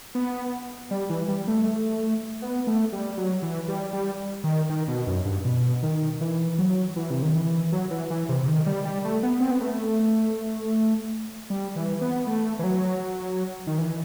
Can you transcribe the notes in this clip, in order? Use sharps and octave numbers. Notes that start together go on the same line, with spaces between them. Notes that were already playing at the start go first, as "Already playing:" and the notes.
B3
G3
E3
G3
A3
B3
A3
G3
F#3
E3
G3
G3
D#3
D#3
B2
F#2
G2
B2
D#3
E3
F#3
E3
C3
D#3
E3
F#3
E3
E3
C3
C3
D#3
G3
G3
A3
B3
C4
B3
A3
G3
E3
B3
A3
E3
F#3
D#3
E3